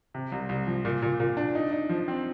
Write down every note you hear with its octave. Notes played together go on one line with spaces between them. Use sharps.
C3
C2
C2
F3
A#2
A#2
A#2
D4
D#4
D#4
F3
C4